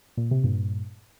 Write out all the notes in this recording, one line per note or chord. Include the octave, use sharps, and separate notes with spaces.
A#2
C3
G2 A#2